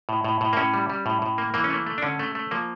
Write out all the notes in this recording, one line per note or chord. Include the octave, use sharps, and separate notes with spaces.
A2
A2
A2
A#3
A2 C#4
G3
G3
A2
A2
A#3
E3 A#3
C#4
A3 A#3
A3
D4
D3 C#4
A3
A3
F3 A#3